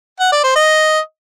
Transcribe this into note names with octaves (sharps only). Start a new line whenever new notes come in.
F#5
D5
C5
D#5